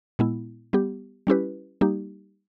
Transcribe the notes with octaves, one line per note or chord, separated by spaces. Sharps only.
A#2 G#3 B3 E4
G3 B3 G4
G3 C#4 E4 G4 B4
G3 A#3 D#4 G4